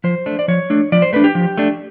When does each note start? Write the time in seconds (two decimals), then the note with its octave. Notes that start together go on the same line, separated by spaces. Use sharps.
0.04 F3 C5
0.26 A3 D4
0.39 D5
0.48 F3 C#5
0.70 A3 D4
0.92 F3 D5
1.02 C5
1.13 A3 D4 B4
1.24 G4
1.35 F3
1.57 A3 D4